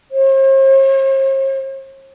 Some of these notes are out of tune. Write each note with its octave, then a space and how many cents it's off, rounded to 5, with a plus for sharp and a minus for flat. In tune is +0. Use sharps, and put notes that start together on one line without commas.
C5 +45